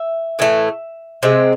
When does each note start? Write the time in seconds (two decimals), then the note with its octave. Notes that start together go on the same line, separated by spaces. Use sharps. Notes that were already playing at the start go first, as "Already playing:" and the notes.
Already playing: E5
0.39 A2 E3 A3
1.23 C3 G#3 C4